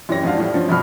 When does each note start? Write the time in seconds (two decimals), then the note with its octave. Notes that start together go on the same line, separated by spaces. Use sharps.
0.09 F#2 E3 G4 C#5 A#6
0.23 F2 G#2 D4 F#4 F5
0.37 A2 F3 G3 F4
0.54 G2 F3 C#4
0.68 G1 F2 B2 F3 B5 F6